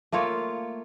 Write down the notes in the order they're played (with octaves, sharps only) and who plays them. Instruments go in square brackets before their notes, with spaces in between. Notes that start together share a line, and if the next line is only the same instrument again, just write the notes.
[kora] A3 A#3 F4 C#5